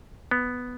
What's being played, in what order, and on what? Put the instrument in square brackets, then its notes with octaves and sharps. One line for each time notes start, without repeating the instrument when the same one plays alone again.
[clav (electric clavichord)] B3